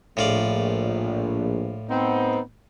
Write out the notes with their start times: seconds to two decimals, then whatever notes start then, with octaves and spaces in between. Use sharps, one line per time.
0.17 A#1 A2 F4 D5
1.90 B3 C4 D#4